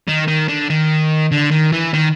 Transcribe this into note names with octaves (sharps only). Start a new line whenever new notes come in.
D#3
D#3
D3
D#3
D3
D#3
E3
D#3